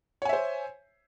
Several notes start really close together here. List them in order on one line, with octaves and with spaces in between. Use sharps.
C#5 G#5 E5 C5